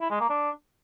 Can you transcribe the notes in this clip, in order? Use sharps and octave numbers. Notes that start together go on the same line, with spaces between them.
E4
G#3
A#3
D4